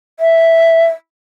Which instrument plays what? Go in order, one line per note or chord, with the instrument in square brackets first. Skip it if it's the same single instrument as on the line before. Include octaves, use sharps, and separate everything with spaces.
[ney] E5